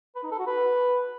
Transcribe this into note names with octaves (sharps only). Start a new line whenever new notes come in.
B4
D#4
A4
F#4
B4